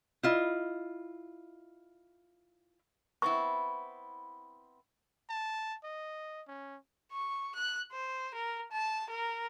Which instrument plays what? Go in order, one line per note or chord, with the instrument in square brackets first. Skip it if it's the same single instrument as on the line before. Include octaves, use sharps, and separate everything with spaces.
[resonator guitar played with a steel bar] E4 F4 D#5
[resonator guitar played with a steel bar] B3 C4 E4 [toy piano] C#6
[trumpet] A5
D#5
C#4
[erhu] C#6
F#6
C5
A#4
A5
A#4